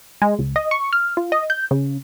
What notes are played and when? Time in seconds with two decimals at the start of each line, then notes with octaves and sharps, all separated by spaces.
0.22 G#3
0.39 C#2
0.56 D#5
0.71 C#6
0.93 F6
1.17 F4
1.32 D#5
1.50 G6
1.71 C#3